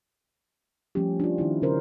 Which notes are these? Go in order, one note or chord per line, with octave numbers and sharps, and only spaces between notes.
F3 G3 A3 C#4 G4
D4 F4
D#3 D#4 E4
C#3 C#4 A#4 C5